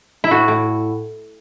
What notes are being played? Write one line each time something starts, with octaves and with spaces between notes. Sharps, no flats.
E4
A2 F#4
A2